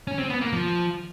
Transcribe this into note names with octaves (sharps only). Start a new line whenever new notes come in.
C#4
C4
B3
A#3
F3